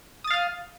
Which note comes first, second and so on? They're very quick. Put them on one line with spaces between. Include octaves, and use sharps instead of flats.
D#6 A6 F5 F6